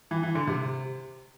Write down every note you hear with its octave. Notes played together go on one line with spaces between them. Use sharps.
E3
E3
D3
C3